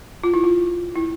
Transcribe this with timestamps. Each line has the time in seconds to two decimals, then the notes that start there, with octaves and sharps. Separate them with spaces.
0.24 F4
0.34 E4
0.44 F4
0.95 E4